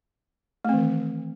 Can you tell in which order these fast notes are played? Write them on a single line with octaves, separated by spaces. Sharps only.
A3 C4 E3 D#3